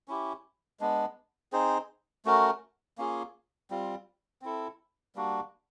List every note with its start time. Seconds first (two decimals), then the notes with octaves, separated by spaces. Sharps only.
0.08 C#4 E4 G4
0.80 G#3 B3 D4
1.52 C4 D#4 G#4 C5
2.25 A3 C#4 F#4 A#4
2.98 A#3 C#4 F4 G#4
3.70 G3 C4 F4
4.42 C4 E4 A4
5.15 G3 A#3 D4 F#4